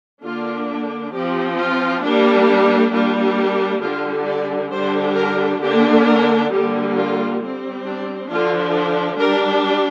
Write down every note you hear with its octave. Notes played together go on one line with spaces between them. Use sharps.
D3 A#3 D4 F4
F3 C4 G4
F4
G3 A#3 D4
G3 A#3 D4 F4
G4
D3 G3 D4 F4
D5
D3 G3 D4 C5
A#4
D3 A#3 D4 G4
A#4
D3 G3 A#3 G4
F4
G3 C4
D4
D3 F3 D4 F4
G3 D4 A#4